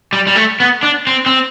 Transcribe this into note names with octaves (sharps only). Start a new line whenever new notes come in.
G3
G3
A3
B3
D4
C4
C4